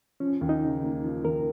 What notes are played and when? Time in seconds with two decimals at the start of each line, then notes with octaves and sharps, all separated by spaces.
0.20 F3 C#4
0.41 D#2
0.49 D#4
0.63 C#3
0.84 A#3
1.04 F3
1.25 D#2 A#4